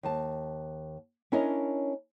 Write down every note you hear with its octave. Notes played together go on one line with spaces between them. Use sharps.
D#2 A5
C#4 D4 E4 A#4 C#5 D#5